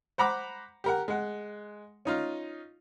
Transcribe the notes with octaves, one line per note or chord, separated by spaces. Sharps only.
C5 F#5 A#5 B5 D6
G4 A#4 F#5
G#3 F#5
C#4 D#4 F4